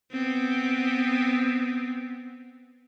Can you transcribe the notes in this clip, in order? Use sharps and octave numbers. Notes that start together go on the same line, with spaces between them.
B3 C4